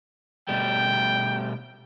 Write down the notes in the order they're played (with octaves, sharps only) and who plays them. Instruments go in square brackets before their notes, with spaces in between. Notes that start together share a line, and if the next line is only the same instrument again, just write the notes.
[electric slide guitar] B2 G3 A3 [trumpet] G5